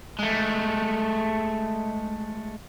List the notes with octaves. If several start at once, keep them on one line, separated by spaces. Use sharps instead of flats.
G#3 A3